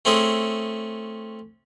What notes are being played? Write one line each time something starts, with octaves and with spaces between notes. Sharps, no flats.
A3 C4 C#4 E4 G#4